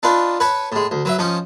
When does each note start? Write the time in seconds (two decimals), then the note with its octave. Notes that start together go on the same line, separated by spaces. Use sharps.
0.03 D4 D#4 F4 B4
0.40 B4 C#5 A5 B5 C#6
0.72 A2 G#3
0.91 D2
1.05 F#3 B4 E5
1.19 F3 C#4 D#4